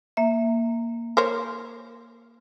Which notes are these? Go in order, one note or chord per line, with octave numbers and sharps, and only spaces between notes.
A#3 E5
A#4 C5 C#5